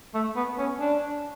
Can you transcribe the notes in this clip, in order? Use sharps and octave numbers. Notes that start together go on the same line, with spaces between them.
A3
B3
C#4
D4